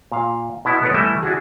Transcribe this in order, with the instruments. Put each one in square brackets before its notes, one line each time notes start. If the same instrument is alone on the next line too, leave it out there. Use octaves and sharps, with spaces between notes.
[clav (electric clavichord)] A#2 F5
B2 B3 E4
G#3 B3 A4 B4 C#5 D5
E3 G3 A3 E4 D#5 E5
D4 E4 F#4 G#4